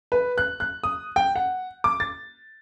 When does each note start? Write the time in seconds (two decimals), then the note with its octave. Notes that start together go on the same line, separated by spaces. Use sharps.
0.12 B4
0.38 F#6
0.60 F#6
0.84 D#6
1.16 G5
1.36 F#5
1.84 D6
2.00 A6